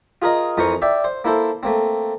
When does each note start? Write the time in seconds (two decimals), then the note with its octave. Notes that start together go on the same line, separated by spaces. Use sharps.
0.22 F4 G#4 A#4 D#5
0.57 F2 E3 A#4 C5 C#6
0.82 D5 E5 G5
1.04 C5
1.24 A#3 E4 A4 C5
1.63 A3 A#3 C4